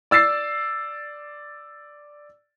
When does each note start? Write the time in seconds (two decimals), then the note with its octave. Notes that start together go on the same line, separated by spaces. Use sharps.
0.11 D5 E6 A6 C7